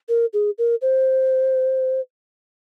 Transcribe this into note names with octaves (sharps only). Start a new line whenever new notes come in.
A#4
G#4
A#4
C5